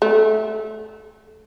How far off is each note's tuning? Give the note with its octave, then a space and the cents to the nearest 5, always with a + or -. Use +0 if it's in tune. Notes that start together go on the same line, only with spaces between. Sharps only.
A3 -20